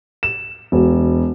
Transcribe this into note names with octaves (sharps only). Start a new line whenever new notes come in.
E7
E1